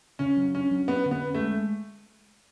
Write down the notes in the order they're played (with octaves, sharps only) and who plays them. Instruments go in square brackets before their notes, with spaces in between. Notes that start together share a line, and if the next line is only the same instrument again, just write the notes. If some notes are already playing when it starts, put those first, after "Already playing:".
[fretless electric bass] C#3 [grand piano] C#4
[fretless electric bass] F#3
[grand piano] C#4 [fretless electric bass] D4
[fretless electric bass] F#3
[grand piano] B3 [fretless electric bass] C#4
[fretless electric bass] D3
[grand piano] B3
[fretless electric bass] C#4
[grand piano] A3
[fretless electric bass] G#3